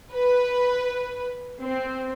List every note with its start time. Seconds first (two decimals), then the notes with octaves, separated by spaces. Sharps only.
0.14 B4
1.62 C4